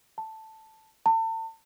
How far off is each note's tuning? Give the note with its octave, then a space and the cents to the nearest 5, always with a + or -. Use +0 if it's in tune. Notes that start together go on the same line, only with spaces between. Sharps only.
A5 +5
A5 +40